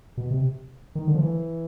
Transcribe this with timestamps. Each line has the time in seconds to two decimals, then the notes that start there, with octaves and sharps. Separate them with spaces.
0.17 B2
0.31 C3
0.95 D#3
1.08 D3
1.15 F3
1.21 E3